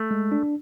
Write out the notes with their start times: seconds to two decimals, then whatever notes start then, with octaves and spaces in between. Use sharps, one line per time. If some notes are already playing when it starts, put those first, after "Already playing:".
Already playing: A3
0.11 G#3
0.32 D4